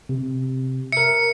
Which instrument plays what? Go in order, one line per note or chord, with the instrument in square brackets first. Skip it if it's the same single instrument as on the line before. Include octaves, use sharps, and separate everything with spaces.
[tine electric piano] C3
[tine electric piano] A#4 E5 [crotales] C#7